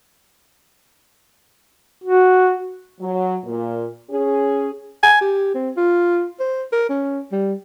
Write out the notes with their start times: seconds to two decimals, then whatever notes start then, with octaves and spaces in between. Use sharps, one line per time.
2.04 F#4
3.01 F#3
3.45 A#2
4.10 C#4 G#4
5.03 G#5
5.21 G4
5.54 C4
5.77 F4
6.40 C5
6.73 A#4
6.90 C#4
7.32 G3